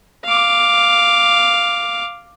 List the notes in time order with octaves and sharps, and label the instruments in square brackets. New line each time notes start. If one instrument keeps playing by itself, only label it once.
[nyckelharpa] F5 D6